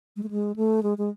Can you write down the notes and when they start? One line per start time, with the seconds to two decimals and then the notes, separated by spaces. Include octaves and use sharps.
0.16 G#3
0.23 A3
0.30 G#3
0.56 A3
0.83 G#3
0.98 G#3